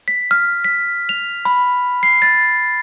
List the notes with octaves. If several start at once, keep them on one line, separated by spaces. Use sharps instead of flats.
B6
F6
B6
F7
B5
C7
A6